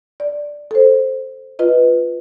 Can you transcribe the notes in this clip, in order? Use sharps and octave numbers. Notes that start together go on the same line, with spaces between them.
D5
A4 C5
F4 B4 D#5